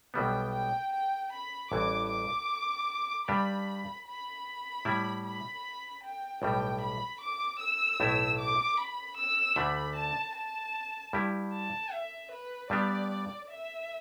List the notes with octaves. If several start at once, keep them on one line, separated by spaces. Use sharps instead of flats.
B1 B2 G3 B3 G5
G5
G5
B5
A1 G2 E3 D6
D6
G2 G3 D4 G4 B5
B5
A2 G3 E4
B5
G5
B1 A2 G3 G5
B5
D6
E6
B1 A2 A3 E4
D6
B5
E6
D2 D3 A3 D4 B5
A5
A5
G2 G3 E4 G4
A5
E5
B4
G2 G3 B3 D4 G4 D5
E5